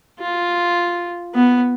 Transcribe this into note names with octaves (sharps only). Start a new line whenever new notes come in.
F4
B3